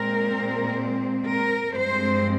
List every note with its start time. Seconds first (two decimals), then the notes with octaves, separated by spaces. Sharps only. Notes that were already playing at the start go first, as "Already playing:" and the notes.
Already playing: A#2 G#3 C4 A#4
1.29 A#4
1.77 G2 F3 G#3 C4 C5